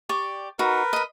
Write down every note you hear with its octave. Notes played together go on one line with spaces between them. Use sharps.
G4 D5 C#6
D#4 F#4 A#4 B4
D#5 B5